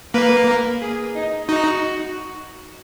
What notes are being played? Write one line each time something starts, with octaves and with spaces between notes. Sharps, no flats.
A#3 B4
A#4
G#4
D#4
D#4 F#4